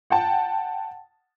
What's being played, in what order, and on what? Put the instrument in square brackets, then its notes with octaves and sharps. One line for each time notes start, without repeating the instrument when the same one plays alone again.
[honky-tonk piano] F#5 G5 A5